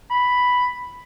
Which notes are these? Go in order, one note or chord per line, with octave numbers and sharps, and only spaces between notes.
B5